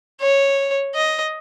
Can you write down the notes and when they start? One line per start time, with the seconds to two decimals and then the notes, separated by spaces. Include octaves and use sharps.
0.21 C#5
0.95 D#5